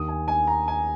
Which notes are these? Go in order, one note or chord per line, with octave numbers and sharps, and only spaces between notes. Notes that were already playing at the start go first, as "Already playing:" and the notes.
Already playing: D#2 D#3 D#6
G#5
G#5
A#5
G#5